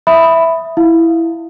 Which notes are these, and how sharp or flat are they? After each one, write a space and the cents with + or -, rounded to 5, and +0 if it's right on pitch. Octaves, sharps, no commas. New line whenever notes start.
E5 +0 B5 +5 D#6 +0
E4 +0 F5 +0